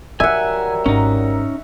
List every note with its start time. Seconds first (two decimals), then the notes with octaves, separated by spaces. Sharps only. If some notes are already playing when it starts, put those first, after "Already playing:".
0.20 D#3 F#3 G3 A#4 E5 F#5 G#5
0.86 G#1 C#4 D#4